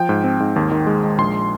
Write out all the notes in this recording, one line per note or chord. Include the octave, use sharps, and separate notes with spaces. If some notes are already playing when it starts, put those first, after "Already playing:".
Already playing: F3 G5
G#2
C4
G#2
D#2
D#3
G#3
G#3
A#1 C6